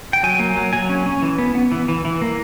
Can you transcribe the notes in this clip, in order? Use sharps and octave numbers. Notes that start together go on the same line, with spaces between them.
G5
F#3 G#5
A#3
F#3
F#3 G#5
C#4
C#4
E3
B3
B3
E3
E3
E3
A#3